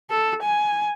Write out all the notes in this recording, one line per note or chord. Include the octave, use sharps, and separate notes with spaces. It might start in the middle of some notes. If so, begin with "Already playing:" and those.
A4
G#5